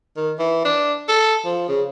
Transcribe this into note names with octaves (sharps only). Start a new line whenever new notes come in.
D#3
E3
D4
A4
F3
C#3